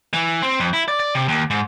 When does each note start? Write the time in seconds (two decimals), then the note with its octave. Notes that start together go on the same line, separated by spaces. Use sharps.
0.14 E3
0.42 C4
0.60 F2
0.73 E4
0.88 D5
1.00 D5
1.15 C3
1.28 D#2
1.50 G#2